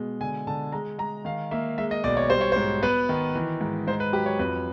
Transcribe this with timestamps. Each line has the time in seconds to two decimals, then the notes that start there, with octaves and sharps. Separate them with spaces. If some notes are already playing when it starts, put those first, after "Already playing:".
Already playing: B2 G#3
0.21 D3 G#5
0.47 D3 A5
0.72 G#3 A#5
0.99 G#3 A#5
1.25 D#3 F5
1.51 A#3 E5
1.78 G#3 E5
1.91 D#5
2.04 B1 D5
2.17 C#5
2.29 G3 C5
2.41 C#5
2.52 C5
2.56 G#2
2.83 B3 B4
3.09 D#3
3.35 E3
3.61 G#2
3.87 G#2 C5
4.00 B4
4.13 F#3 G4
4.26 C#5
4.39 F2 B4